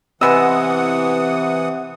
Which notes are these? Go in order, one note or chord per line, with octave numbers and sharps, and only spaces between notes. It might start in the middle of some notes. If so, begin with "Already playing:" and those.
C3 E3 G#3 B3 D#5 F#5 D#6 E6